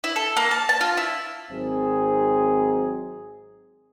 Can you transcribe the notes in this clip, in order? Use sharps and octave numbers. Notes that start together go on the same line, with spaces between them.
E4
A4
A#3
A5
A5
F4
E4
G#1 F#3 C4 D#4 G#4